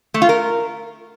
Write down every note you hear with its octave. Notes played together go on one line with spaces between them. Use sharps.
A3
F4
A#4